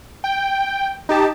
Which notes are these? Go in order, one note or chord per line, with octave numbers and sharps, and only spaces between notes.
G5
D#4 G4 A5